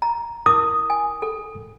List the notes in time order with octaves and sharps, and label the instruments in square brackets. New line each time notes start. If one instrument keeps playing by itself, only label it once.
[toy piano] A#5
[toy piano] E4 A#4 D6 [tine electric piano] D#6
[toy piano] G#5
A4